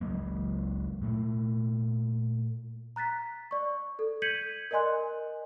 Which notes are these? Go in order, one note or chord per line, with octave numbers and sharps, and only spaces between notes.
C#2 F#3 G#3 A#3
A#2 A3
A#5 F#6 A6 B6
D5 C#6
A4
G6 G#6 B6 C#7 D#7 F#7
A#4 D5 D#5 G#5 C6 F#6